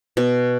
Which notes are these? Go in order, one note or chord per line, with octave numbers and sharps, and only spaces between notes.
B2